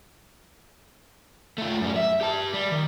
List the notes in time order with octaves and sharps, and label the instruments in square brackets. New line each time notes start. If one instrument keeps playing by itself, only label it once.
[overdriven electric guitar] A3 F4
F#2 G3
E5
G4 A5
G3
D#3